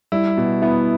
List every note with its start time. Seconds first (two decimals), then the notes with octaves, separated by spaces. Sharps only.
0.12 G3 E4
0.37 B2
0.62 B3 E4